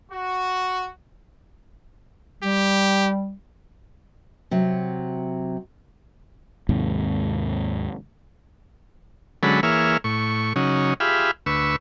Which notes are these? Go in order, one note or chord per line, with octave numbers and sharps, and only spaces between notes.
F#4
G3 G4
C3 F#3
D#2 G#2 C3
D3 F#3 G#3 C#4 A4 B5
E3 A#3 G#4 C#5 E5 F6
A2 C#6
C#3 F#3 C#4 D#4
F4 G4 G#4 E5 F5 B5
D2 B4 C#6 E6